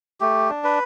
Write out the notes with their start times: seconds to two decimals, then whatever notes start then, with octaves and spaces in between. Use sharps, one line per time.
0.20 A3 G4
0.49 D4
0.64 B4